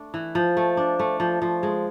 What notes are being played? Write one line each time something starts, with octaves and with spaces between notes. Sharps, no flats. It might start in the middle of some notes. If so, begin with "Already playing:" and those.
Already playing: A3 D4
E3
F3
A3
D4
A3
F3
F3
G#3